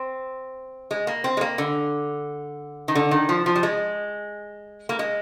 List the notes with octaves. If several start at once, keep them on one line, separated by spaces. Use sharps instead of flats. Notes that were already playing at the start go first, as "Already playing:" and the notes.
Already playing: C4
G#3
A#3
C4
G#3
A#3
D3
D#3
D3
D#3
F3
F3
G3
G#3
A#3
G#3